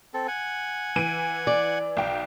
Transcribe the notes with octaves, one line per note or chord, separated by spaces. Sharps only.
C4 A4
F#5 G#5
E3 D7 D#7
D5
B1 G5